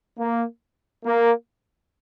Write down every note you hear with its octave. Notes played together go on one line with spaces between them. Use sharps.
A#3
A#3